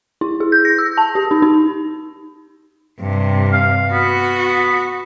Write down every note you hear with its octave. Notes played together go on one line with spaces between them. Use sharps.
E4
G#4
G6
A#6
E6
A5
G4
D#4
D#4
G2 C3
F5
B3 F#4